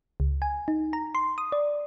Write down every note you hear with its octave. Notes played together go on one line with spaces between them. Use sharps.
C#2
G#5
D#4
A#5
C6
D#6
D5